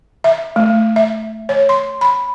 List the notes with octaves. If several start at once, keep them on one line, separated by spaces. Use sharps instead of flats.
E5
A3
E5
C#5
C6
B5